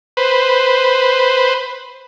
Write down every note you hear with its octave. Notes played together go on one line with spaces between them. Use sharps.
B4 C5